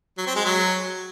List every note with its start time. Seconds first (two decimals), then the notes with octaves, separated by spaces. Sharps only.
0.18 F#3
0.27 C4
0.35 G#3
0.44 F#3